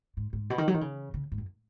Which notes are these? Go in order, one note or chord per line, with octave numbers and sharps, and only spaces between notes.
G#2
G#2
B2
D#3
F#3
D#3
C#3
C#3
G#2
F#2